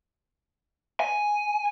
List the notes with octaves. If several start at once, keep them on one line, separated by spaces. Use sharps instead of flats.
G#5